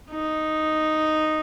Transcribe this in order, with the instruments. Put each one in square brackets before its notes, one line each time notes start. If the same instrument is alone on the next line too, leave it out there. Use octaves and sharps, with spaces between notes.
[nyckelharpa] D#4